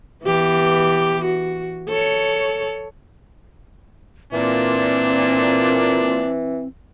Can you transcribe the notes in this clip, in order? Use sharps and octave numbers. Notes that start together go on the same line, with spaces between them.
E3 B3 G4
F#4
A4 C#5
A#2 E3 C4 D4